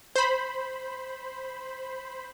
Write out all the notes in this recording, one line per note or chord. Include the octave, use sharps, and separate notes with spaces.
C5 B5